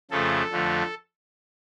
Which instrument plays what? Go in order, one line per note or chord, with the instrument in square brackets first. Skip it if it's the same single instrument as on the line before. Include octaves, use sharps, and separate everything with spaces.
[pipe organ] F2 C#3 F3 A3 A4
F2 D3 F3 A3